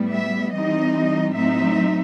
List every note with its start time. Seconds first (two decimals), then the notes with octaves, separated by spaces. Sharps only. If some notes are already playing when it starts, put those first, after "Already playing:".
Already playing: A2 G3 B3
0.12 E5
0.53 E3 G3 C4 D#4 D#5
1.33 A2 F#3 C4 D#4 E5